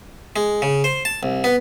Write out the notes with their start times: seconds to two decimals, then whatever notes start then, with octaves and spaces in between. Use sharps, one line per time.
0.36 G#3
0.62 C#3
0.84 C5
1.05 A5
1.23 C2
1.44 B3